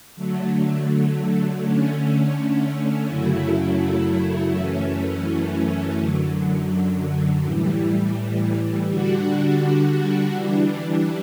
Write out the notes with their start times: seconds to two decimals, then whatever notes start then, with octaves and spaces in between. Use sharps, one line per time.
0.16 D3 F#3 A3
1.61 D3 A3 C#4
3.07 F#2 C#3 F#3 A3 E4
4.52 F#2 E3 A3 C#4
5.97 F#2 D3 F#3
7.42 A2 E3 G3
8.88 D3 G3 D4 F#4
10.33 E3 G3 D4